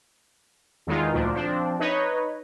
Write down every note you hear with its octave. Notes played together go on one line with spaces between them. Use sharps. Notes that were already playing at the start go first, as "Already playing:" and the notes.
E2 D#3 G#3 D#4 F4
D2 A#2 F3 D4
F3 C4 D4
D#4 B4 C#5 D#5